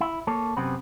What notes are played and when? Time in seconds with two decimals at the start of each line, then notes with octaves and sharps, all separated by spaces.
0.01 E4
0.27 A#3 A4 C#5
0.57 F#2 C3 B3 C4 B4